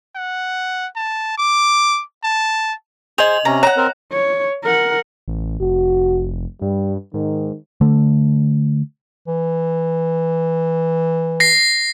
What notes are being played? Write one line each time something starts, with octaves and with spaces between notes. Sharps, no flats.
F#5
A5
D6
A5
G#4 C5 D#5 F7
C3 C#4 A#5
C#5 F#5 A#5
C4 A#4
C#5
A#4 F#5
A1
F1 F#4
G2 G3
G#2 D#3
D3 A3
E3
A#6 C7